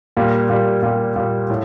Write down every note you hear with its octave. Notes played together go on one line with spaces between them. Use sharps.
A#2 G3 A#3
A#2 G3 A#3
A#2 G3 A#3
A#2 G3 A#3
A2